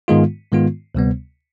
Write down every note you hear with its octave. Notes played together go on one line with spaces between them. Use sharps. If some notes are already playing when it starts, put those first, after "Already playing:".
G#2 D#3 G#3 B3 F4
G#2 D#3 G#3 B3 F4
D2 C3 G3 B3